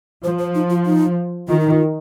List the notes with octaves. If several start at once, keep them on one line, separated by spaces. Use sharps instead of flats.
F3 C5
C5
D#4
F4
D#4
D#3 F4
D#4
F4